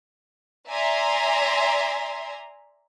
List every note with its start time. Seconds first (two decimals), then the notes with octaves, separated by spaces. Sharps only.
0.69 D5 E5 G#5 A#5 C6